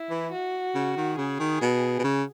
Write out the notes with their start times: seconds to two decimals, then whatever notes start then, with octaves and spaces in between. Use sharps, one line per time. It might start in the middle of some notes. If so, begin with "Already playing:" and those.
Already playing: E4
0.10 E3
0.32 F#4
0.75 C#3
0.97 D#3
1.18 C#3 G#4
1.40 D#3
1.61 B2
1.99 B2
2.04 C#3